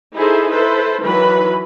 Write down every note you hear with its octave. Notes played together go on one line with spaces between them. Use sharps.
D#4 E4 G#4 A4 C5
E4 A4 B4 C5
D#3 E3 F#3 B4 B5